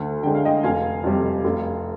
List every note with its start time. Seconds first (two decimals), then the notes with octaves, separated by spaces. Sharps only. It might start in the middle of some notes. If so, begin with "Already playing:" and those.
Already playing: D2
0.23 D3 G#3 G5
0.35 F5
0.45 D#5 G5
0.63 F1 F5 G#5
1.04 F2 C3 G3
1.44 F1